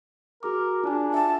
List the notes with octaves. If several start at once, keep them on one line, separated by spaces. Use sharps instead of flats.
F#4 G#4 A#4 D6
D4 F4 G#5
E5 F#5 A5